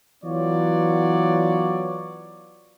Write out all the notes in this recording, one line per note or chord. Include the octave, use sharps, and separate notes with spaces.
E3 F#3 B3 F4 C#5 D5